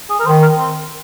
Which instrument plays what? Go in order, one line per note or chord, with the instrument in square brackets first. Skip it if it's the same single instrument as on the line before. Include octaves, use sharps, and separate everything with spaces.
[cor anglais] G#4
A#4
[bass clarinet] D#3 [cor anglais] C5
[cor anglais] A#4
C4